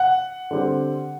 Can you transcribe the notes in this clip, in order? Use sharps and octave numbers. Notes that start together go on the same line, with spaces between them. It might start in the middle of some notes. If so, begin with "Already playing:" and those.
Already playing: F#5
D3 G3 C4